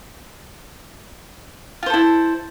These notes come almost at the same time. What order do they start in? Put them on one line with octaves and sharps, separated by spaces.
F4 C5 A4 E4